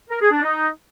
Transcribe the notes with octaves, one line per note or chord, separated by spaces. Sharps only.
A#4
G#4
D4
D#4